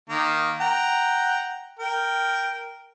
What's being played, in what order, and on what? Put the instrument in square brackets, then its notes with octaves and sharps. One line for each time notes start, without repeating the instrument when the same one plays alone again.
[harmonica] D#3 A#3
F#5 G5 A#5
A#4 G5